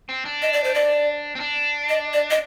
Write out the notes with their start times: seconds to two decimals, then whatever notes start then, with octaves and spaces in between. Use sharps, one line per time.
0.09 C4
0.25 D4
0.42 D#5
0.53 D5
0.64 C5
0.74 D5
1.35 C4
1.40 D4
1.89 D#5
2.13 D5
2.31 D#5